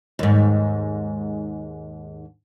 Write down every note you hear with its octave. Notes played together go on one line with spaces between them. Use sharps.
D#2 G#2